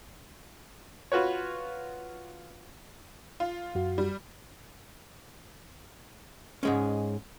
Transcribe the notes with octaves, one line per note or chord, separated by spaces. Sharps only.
F4 F#4 B4 C#5
F4
F#2 F#4
G3
G#2 G#3 C#4